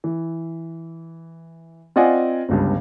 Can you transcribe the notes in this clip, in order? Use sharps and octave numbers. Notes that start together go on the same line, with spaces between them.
E3
C4 F4 D5 D#5 F#5 G#5
G1 C#2 G2